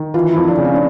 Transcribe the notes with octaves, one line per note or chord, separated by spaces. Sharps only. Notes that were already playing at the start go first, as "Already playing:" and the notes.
Already playing: D#3
E3 F4
E4
F2
D4
C#3
C#4
D4